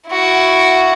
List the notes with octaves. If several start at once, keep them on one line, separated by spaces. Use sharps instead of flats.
E4 F#4